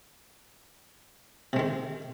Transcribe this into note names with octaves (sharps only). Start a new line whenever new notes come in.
C3 D#3 G#3